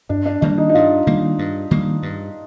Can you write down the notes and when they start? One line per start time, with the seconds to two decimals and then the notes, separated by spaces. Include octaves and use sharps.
0.09 G2 D4
0.26 D4
0.41 D#3 G3 A#3 D4
0.58 D#4
0.69 D#4
0.74 G2 F4
1.07 D#3 G3 A#3
1.39 G2
1.71 D#3 G3 A#3
2.03 G2